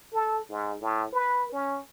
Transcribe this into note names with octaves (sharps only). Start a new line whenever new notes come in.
A4
G#2
A2
B4
C#4